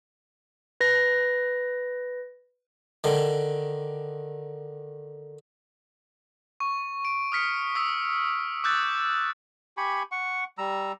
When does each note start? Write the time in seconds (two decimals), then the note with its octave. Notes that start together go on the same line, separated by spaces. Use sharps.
0.81 B4 A#6
3.04 D3 D#3
6.60 C#6
7.05 D7
7.32 D#6 F6 B6 C#7
7.75 D#6 E6 B6
8.64 D6 E6 F#6 G6 A6
9.77 G4 G#5 B5 C#6
10.12 F#5 C#6
10.58 G3 A#5 E6